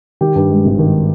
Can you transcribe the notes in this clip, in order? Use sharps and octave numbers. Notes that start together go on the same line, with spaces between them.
D#3 G4
G2
G#3
G#1
D#3